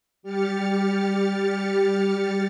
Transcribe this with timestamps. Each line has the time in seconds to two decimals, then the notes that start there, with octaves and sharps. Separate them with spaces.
0.23 G3 G4 F6 A6 C#7